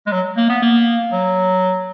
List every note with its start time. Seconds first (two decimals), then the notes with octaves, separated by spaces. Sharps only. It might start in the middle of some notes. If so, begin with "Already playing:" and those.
0.07 G#3
0.12 F#3
0.37 A#3
0.49 B3
0.62 A#3
1.12 F#3